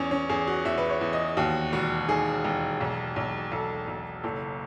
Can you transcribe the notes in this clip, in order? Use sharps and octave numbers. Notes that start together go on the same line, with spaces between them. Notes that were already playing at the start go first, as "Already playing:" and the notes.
Already playing: E2 C#4
C#4
E2 G#4
F#4
E2 E5
B4
C#5
E2
D#5
D#2 F#4
E1 F#4
D#3 G#4
E1
B1
B1
B1 A4
B1
F#1 A4